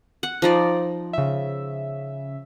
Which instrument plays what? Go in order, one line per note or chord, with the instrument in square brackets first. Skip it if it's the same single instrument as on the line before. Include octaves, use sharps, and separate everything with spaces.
[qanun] F#5
F3 D#4 D5
[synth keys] C#3 E5